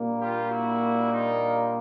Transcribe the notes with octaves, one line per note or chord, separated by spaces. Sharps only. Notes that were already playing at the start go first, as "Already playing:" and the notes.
Already playing: A#2 G3 A#3 D4
F4 G4
E4 F#4
D#4 F4